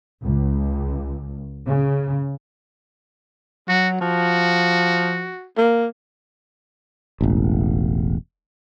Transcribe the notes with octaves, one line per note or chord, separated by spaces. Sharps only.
C#2
C#3
F#3 F#4
F3 F#4
A#3
E1 A1